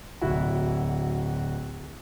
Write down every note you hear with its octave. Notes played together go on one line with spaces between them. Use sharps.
D1 E4 F#4